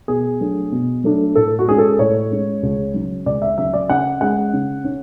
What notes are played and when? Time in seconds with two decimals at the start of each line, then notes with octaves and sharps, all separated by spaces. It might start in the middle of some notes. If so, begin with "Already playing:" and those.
0.08 B2 G#4
0.41 F#3 A3 D4
0.72 B2
1.04 F#3 A3 D4
1.35 A2 A4
1.59 F#4
1.68 G#3 C#4 G#4
1.78 A4
1.99 A2 C#5
2.31 G#3 C#4
2.63 C#2
2.94 C#3 F#3
3.26 C#2 D5
3.42 E5
3.58 C#3 F#3 E5
3.73 D5
3.89 C#3 F#5
4.21 G#3 C#4 F#5
4.53 C#3
4.85 C#4